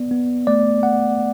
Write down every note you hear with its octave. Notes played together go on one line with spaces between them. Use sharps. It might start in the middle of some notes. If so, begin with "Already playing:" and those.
Already playing: B3 D5
B3
A3 D5
A3 F#5